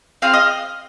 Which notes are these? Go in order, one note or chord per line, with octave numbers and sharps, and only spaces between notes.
C4 F4 G#4 F5
D#5